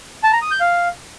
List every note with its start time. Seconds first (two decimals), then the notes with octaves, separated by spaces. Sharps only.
0.23 A5
0.33 A#5
0.42 D#6
0.51 G6
0.60 F5